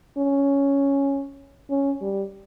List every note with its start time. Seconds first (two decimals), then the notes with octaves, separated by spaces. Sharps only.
0.18 C#4
1.70 C#4
2.01 G3